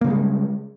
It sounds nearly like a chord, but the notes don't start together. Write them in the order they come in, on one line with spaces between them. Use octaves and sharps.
A#3 C#3 G3 G#3